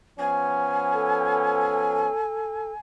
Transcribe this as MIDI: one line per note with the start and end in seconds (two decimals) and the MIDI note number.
0.19 2.10 53
0.19 2.10 59
0.19 2.10 61
0.19 2.79 80
0.94 2.72 69